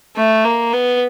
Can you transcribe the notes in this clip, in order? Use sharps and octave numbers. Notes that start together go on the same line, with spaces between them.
A3
A#3
B3